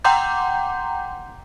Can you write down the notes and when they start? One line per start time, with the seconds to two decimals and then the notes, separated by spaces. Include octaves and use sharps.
0.04 F#5 G5 A#5 C6 D6 G6